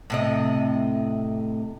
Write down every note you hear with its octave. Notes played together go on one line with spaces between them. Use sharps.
A2 C3 D#5